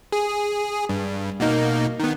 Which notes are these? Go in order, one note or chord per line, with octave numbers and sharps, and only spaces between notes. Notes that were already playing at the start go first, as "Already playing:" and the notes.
G#4
G2
B2 A#3 D#4
D#3 B3